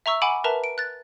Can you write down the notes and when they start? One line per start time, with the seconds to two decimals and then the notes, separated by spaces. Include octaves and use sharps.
0.06 E5 A#5 C#6 E6
0.22 F#5 G#5 B5 D6 D7 F#7
0.44 A#4 B4 E5 A5 A#5
0.64 D7
0.78 F#6 A6